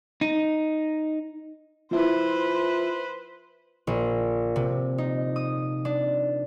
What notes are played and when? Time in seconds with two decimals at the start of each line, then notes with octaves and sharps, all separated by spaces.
0.21 D#4
1.91 F3 E4 B4 C5
3.87 A#1
4.56 C3
4.98 D#4
5.36 D#6
5.85 D4